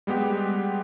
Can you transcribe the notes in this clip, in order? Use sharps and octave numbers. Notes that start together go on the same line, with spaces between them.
G3 G#3 B3 G4